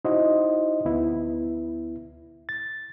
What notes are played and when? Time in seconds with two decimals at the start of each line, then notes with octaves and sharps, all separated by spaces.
0.05 D#4 E4 F#4 C5 D#5
0.85 D2 B3 E4
2.49 A6